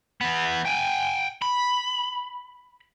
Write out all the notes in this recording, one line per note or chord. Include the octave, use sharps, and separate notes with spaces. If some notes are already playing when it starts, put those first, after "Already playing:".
E3 B3
G5 G#5
B5